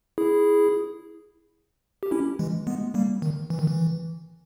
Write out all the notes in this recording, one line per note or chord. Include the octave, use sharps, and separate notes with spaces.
E4 G#4
G4
C#4 E4
E3 G#3
G#3 B3
G3 A#3
D#3
E3
D#3
E3